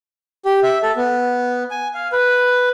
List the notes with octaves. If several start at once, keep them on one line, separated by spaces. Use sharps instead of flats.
G4
E5
A4
B3
G#5
F5
B4